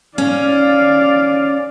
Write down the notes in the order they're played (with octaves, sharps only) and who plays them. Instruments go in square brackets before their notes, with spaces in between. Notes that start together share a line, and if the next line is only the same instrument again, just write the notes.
[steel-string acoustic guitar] C#4 [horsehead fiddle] D5 F5